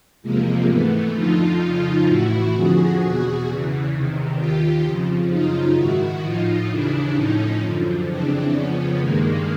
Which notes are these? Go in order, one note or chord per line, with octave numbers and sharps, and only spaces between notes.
E2 C3 F3 G#3 A#3
G#2 E3 A3 B3
F2 D3 F3 D#4 F4
F2 C#3 F3 D#4 F4
A2 E3 E4 F#4
F2 D3 F3 F#4 G#4
E2 B2 F#4 G#4
E2 C#3 E3
E2 C3 D#3
D#2 D#3 F4 G4
F2 C#3 F3
F#2 C#3 F3 D#4 F4
G#2 D#3 E4 F#4
A2 F3 D#4 F4
D#2 C#3 E3 D4 E4
A2 F3 C#4 D#4
F#2 D3 F3
F2 C#3 E3 C4 D4
F2 C#3 F3 B3 C#4
G2 D#3 G#3 A#3